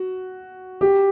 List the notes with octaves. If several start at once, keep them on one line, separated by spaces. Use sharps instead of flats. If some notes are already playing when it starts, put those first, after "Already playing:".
Already playing: F#4
G4